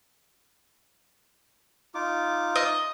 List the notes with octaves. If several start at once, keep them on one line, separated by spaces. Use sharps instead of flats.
D#4 F4 D6
D#5